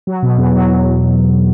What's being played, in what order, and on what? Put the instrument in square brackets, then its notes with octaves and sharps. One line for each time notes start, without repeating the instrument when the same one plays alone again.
[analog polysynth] F#3
B2
E2
F#3
E2